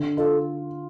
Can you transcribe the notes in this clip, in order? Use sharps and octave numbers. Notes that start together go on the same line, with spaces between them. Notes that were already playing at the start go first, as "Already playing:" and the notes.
Already playing: D3
F4 A4